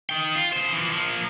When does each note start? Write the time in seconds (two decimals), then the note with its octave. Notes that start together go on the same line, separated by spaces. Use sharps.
0.10 D#4 G5
0.35 F4
0.52 C#3 C5
0.73 E3 F3
0.92 F3 A#3